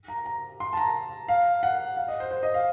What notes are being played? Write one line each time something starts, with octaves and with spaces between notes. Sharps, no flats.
A#5
A#5
C6
A5
A#5
F5
F#5
F5
D#5
C5
C5
D#5
F5